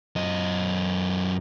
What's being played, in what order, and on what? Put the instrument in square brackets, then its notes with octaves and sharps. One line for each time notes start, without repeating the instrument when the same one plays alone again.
[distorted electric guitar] F#2 D#5